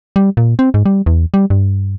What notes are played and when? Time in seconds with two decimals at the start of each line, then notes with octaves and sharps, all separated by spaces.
0.16 G3
0.37 A#2
0.59 C4
0.74 G#2
0.86 G3
1.06 E2
1.34 G3
1.50 G2